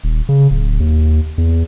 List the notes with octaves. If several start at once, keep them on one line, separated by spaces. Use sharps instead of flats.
D#1
C#3
D1
D#2
E2